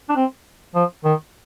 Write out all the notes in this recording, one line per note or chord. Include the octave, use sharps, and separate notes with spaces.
D4
C4
F3
D#3